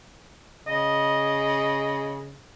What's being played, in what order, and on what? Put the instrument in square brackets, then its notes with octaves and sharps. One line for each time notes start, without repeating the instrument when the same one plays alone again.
[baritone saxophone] C#3 [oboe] D#5